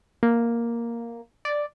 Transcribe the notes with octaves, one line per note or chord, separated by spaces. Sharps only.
A#3
D5